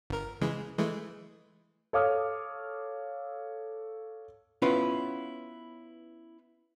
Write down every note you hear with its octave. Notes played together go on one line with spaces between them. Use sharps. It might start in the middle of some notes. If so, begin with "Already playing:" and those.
G1 A#4
C#3 E3 G#3
E3 G#3 A3
A4 C#5 F5 D6 D#6 F6
B3 C#4 E4 F4 B4